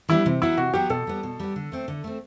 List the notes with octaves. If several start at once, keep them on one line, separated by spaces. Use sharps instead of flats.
E3 G3 B3 D4 E4
C3
F#3 B3 E4 F#4
C3 F#4
F#3 B3 F#4 G4
B2 A4
G3 B3
B2
G3 B3
D3
A3 C4
D3
A3 C4